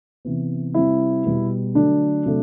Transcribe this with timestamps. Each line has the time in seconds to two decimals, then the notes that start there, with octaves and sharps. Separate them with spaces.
0.25 C3 E3 B3
0.74 C3 G3 C4 E4
1.25 B2 G3 B3
1.75 D3 F#3 A3 D4
2.26 C3 F#3 A3